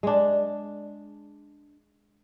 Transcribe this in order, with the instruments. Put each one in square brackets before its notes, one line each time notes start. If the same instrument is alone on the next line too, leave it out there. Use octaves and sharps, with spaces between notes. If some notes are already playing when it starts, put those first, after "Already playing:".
[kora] G#3 D4